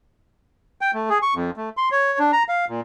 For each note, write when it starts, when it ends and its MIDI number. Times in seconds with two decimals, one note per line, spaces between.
0.81 0.91 79
0.94 1.09 57
1.09 1.18 68
1.22 1.34 85
1.35 1.50 41
1.57 1.69 57
1.77 1.89 84
1.92 2.19 73
2.19 2.31 62
2.33 2.43 82
2.49 2.65 77
2.69 2.81 46